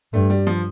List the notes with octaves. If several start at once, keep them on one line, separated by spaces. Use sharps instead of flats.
G2 A3
G3
F3